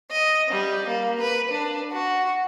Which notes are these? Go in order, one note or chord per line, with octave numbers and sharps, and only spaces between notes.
D#5
G3
A#3
B4
D4
F#4